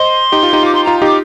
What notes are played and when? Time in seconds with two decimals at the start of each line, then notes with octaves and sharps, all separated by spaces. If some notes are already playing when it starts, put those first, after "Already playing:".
Already playing: C5 D#5 C6
0.32 D#4 G4
0.43 F4
0.53 D#4 G4
0.63 F4 D6
0.74 D#4 C6
0.84 F4 A#5
1.02 D#4 G4 D6